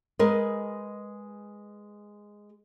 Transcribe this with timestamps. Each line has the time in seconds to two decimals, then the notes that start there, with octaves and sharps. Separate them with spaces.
0.19 G#3 A#4 B4 D#5